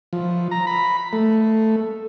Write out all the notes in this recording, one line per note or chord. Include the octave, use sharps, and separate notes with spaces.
F3
A#5
B5
A3